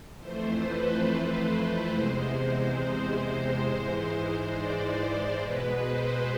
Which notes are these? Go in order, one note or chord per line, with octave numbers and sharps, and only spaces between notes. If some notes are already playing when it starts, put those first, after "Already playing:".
F2 E3 A3 C5
B4
B4
C5
E2 C3 G#3 C5
C5
C5
G#2 E3 G#3
D5
C5
B2 G#3 B4
C5